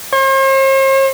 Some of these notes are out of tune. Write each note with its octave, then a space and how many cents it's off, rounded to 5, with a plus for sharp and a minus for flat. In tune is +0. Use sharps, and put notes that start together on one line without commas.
C5 +45